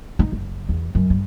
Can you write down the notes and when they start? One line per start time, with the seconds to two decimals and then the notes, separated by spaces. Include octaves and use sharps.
0.19 D#4
0.32 F#1
0.69 E2
0.95 F#2
1.10 G2